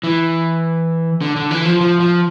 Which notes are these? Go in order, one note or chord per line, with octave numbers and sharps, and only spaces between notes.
E3
D3
D3
E3
F3
F3
F3